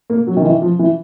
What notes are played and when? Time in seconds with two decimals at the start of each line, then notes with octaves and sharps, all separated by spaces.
0.10 A#3
0.27 F#3
0.37 D#3
0.45 E3
0.62 F3
0.79 E3